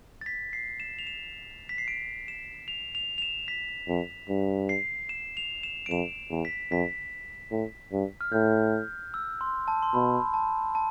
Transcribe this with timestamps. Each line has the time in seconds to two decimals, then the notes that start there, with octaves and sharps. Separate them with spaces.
0.21 A6
0.26 B6
0.53 C7
0.80 E7
0.99 F7
1.07 E7
1.69 B6
1.78 C7
1.88 D7
2.28 E7
2.68 F7
2.95 F7
3.18 F7
3.22 E7
3.48 B6
3.88 F2
4.29 G2
4.69 C7
5.09 E7
5.37 F7
5.63 E7
5.86 D7
5.90 F2 E7
6.31 E2
6.45 B6
6.71 F2 B6
7.51 A2
7.92 G2
8.21 F6
8.32 A2 G6
9.14 E6
9.41 C6
9.68 A5
9.83 C6
9.94 B2 B5
10.34 A5
10.75 A5